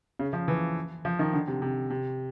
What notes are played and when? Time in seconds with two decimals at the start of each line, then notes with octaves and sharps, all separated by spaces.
0.19 C#3
0.33 F3
0.48 E3
1.05 F3
1.19 D#3
1.33 D3
1.47 C3
1.62 C3
1.90 C3